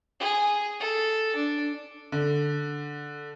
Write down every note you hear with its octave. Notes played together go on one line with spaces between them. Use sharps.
G#4
A4
D4
D3